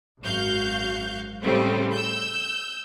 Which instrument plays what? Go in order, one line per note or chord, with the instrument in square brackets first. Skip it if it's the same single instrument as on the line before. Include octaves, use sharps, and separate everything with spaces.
[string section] G#1 F#2 F#4 F5 G6
A2 C#3 G3 A3 C4
E6 G6